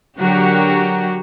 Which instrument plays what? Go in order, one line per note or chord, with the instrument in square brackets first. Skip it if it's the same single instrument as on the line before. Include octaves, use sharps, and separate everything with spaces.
[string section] D3 F#3 F#4 G4 A#4